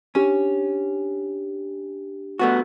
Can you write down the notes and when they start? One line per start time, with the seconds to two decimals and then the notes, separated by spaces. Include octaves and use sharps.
0.15 C#4 D4 G4
2.39 A3 B3 F#4